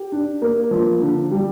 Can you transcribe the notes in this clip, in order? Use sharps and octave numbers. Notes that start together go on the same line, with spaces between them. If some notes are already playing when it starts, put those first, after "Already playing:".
Already playing: G4
D4
A#3
F3
D3
G3